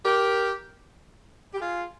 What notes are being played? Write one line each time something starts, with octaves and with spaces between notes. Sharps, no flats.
G4 A#4
G4
F4 G#4